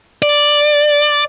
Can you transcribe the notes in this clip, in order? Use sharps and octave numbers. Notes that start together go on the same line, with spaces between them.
D5